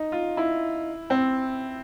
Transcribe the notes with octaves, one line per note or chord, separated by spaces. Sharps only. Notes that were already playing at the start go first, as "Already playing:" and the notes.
Already playing: D#4
F4
E4
C4